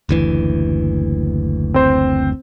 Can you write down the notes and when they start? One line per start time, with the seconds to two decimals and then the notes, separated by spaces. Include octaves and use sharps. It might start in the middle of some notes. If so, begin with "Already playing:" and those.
0.09 F#1 D2 E3
1.74 C4 C5